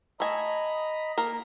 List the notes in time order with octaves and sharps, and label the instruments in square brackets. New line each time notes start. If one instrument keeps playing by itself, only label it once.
[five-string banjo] A3 G#5 [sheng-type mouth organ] D#5 A#5 B5
[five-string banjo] A#3 A#4